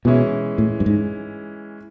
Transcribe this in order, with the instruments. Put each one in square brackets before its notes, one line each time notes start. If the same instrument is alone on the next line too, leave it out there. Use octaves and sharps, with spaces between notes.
[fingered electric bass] B2 [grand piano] E3 G#3 C#4 E4
[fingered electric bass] A2
G2
G#2